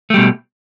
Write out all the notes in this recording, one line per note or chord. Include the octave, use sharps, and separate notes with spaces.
B2 G3 A3